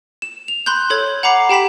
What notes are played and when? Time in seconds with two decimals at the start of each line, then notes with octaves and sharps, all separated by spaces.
0.22 E7
0.48 F7
0.66 B5 C6 F#6 G6
0.90 A4 C#5 G#6
1.23 F#5 A#5 B5 D6 C7
1.49 G4 G5 B5 B6 E7